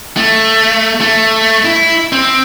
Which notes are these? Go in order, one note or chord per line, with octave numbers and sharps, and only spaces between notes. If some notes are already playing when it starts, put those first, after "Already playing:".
A3
A3
E4
C4